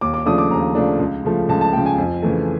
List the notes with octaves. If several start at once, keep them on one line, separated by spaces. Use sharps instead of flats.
D#2 D6
D6
C#3 F3 A3 D4 D#6
D6
D#2 A#5
C#3 F3 A3 D4
C#2
C#3 F3 A3
C#2 A5
A5
C#3 F3 A3 G5
G#5
F2
C#3 E3 A3